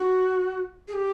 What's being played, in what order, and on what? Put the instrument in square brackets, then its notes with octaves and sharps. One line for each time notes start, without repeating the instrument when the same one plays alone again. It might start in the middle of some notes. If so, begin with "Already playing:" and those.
Already playing: [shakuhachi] F#4
G#4
G4